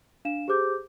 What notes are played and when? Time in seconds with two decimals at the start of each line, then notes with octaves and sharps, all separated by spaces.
0.25 D4 F5 E7
0.48 G4 G#4 C5 D6 G6